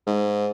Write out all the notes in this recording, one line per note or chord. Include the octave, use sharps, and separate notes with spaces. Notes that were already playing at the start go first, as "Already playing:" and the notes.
G#2